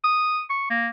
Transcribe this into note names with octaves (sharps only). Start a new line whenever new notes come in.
D#6
C#6
A#3